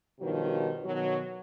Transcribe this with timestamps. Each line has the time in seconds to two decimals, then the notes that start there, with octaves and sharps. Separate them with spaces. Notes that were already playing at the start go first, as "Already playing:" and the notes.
0.20 G2 B2 D#3 F3 F#3
0.84 B2 D#3 F#3